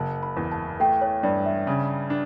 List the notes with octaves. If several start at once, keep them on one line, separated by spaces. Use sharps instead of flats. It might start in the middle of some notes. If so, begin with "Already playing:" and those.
Already playing: F#1 A5
B5
E2
A5
A3 G5
C#5
G2 D5
E5
C#3
D4